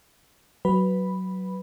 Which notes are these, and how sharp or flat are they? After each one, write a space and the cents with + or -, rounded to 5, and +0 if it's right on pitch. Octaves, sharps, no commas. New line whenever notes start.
F#3 +15 B4 +0 B5 +0